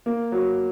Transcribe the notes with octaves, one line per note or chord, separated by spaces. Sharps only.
A#3
F#3